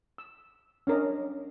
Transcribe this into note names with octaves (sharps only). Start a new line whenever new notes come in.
E6
C#4 D4 A#4 D5 D#5